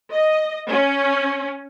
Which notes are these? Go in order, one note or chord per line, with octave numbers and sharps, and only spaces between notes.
D#5
C#4